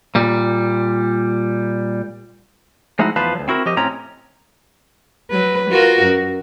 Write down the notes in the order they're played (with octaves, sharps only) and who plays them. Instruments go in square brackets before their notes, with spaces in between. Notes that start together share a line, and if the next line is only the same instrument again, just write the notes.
[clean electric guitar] A#2 G3
F3 G#3 A3 D#4 E4 F#4
E2 F3 B4 F5 A5 B5
D2 F#3
C4 E4 F#4 A#4
F3 G4 D#5
A2 C4 C#4 A#5
[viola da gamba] F#3 B4
F4 F#4 A#4
F#2